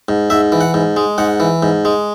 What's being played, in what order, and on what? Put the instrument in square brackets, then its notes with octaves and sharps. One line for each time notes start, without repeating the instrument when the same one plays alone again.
[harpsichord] G#2
G#2 E5
E3
F#5
G#2
G#3
G#2 F#5
E3
G#2
G#3